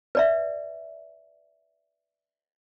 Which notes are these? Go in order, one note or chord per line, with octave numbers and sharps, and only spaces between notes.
B4 D5 E5